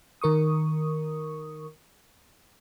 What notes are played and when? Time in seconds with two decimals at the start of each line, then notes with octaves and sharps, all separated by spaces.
0.21 D#3 A#4 C#6 D#6